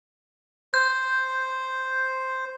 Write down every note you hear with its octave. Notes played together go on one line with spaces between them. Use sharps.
C5 G6